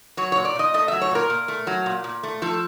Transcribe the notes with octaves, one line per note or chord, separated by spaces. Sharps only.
F#3 C#5
A#2 C#5
D5
A#2 D#5
A3 D#5
F#3 E5
C#5
A#2 A#4
A#2
A3
F#3
A#2
A#2
A3
F3 A4